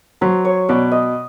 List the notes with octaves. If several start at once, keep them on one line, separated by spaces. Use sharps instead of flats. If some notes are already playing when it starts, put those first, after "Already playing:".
F#3 C5
C#5
B2 D5
D#5